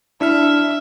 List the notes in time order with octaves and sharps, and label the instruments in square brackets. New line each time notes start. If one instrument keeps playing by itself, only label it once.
[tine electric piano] D4 E4 F6 [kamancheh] E5